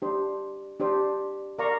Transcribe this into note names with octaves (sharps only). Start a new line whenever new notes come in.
D4 G4 C5
D4 G4 C5
A#4 D5 F5 A#5 C#6